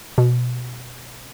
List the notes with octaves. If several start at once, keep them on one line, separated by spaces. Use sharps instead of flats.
B2